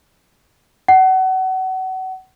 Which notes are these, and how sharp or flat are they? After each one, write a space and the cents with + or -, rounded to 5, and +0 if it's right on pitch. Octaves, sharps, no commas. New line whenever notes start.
F#5 +30